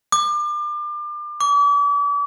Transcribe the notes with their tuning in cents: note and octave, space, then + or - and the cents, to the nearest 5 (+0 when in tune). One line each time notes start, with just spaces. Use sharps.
D6 +30
D6 -40